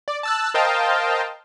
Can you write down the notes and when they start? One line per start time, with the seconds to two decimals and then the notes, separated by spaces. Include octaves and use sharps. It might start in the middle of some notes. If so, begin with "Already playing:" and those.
0.08 D5
0.23 A5 E6 F#6
0.54 A#4 C5 D#5 F5 G5 A5